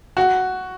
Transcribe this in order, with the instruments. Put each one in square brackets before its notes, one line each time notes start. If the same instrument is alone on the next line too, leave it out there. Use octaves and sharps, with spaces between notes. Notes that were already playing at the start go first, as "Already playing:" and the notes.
[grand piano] F#4